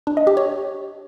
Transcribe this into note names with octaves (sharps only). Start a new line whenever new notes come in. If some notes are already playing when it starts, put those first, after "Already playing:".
D4
D#5
G4
C#5